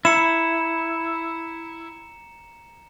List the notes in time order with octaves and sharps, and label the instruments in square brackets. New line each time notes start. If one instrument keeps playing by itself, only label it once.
[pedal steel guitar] E4 [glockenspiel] A#5 C#7 E7